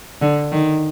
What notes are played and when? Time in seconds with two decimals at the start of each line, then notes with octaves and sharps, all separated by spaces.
0.21 D3
0.52 D#3